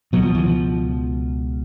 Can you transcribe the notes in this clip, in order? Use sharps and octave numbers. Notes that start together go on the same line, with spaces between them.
C#2 B2 F#3
F3
E3
F3